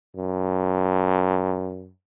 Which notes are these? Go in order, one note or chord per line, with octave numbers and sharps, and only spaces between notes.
F#2